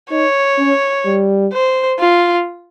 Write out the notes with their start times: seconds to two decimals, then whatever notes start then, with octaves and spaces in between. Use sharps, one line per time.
0.11 D#4 C#5
0.58 C#4
1.05 G3
1.53 C5
2.00 F4